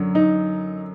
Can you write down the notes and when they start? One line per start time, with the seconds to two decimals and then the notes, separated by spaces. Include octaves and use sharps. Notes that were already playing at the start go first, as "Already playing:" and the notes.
Already playing: F#2 D3 F#3
0.15 D#4